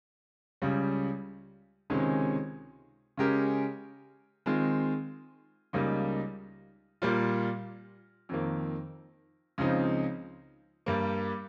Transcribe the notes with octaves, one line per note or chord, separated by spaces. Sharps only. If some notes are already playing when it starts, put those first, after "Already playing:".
C#2 C#3 G3
C#2 C3 D#3 G#3 C#4
C#3 G#3 C#4 G4 A#4
D#3 G#3 C4 F4
C#2 C#3 G3 A#3 D#4
A#2 G3 A#3 F4
F2 D#3 A#3
C#2 C#3 F3 C4 D#4
G2 G3 A#3